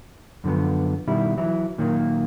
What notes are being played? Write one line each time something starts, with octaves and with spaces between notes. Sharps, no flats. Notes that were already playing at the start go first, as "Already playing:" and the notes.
F#2 D3 F3 B3
B2 D#3 G3 E4
E3 F#3 E4
A#2 D#3 F#3 A#3